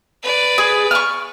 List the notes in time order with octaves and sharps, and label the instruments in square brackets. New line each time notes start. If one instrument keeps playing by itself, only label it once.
[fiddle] B4 D5
[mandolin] G#4
C#6 F6